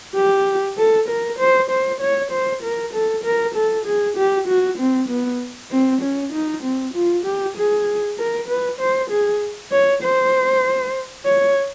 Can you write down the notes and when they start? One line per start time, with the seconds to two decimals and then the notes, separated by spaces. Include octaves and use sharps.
0.16 G4
0.78 A4
1.09 A#4
1.39 C5
1.70 C5
2.01 C#5
2.32 C5
2.63 A#4
2.93 A4
3.24 A#4
3.55 A4
3.85 G#4
4.17 G4
4.48 F#4
4.78 C4
5.09 B3
5.71 C4
6.02 C#4
6.33 D#4
6.63 C4
6.94 F4
7.25 G4
7.56 G#4
8.18 A#4
8.48 B4
8.80 C5
9.10 G#4
9.72 C#5
10.03 C5
11.26 C#5